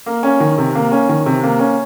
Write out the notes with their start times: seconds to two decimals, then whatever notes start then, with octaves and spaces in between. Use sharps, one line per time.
0.06 A#3
0.23 C#4
0.40 D#3
0.58 C3
0.75 A#3
0.92 C#4
1.09 D#3
1.26 C3
1.43 A#3
1.59 C#4